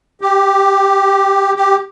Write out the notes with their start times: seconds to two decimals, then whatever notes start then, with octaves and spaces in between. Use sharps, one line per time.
0.21 G4
1.56 G4